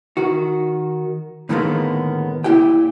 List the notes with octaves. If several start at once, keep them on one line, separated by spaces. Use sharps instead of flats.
D#3 F#4
A2 D3 D#3 G#3 A#3 B3
A#2 E4 G4 G5